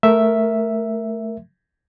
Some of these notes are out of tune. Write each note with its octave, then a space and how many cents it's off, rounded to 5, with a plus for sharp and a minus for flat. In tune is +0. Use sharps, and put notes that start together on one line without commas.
A3 +0 A#4 +0 E5 +0